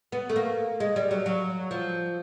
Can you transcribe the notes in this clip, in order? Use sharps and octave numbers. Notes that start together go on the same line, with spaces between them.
B3
A3
A#3
G#3
G3
F#3
F#3
F3